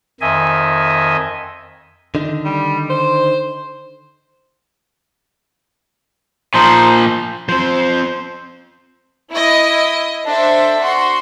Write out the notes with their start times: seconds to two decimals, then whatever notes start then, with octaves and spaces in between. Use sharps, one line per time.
0.21 F2 D#3 D#5 E5 G#5
2.15 D3 D#3 D#4
2.45 G3
2.90 C5
6.54 A#2 F3 D#4 C5 C6
7.49 F3 C4 C5
9.30 E4 D#5
10.25 D4 A4 C5 E5
10.82 F#4 C6